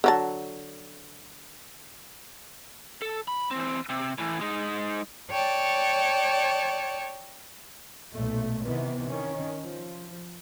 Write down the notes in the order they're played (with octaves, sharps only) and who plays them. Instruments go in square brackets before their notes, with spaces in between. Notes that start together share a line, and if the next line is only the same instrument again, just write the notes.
[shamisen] D3 F#3 A5
[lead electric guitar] A4
B5
E3 C4
C3
A2 E3
G#3 D#4
[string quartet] C#5 D5 G5 A5
[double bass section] B1 A#2 A3
C3 D#3 E3 B3
D#3 C#4
F3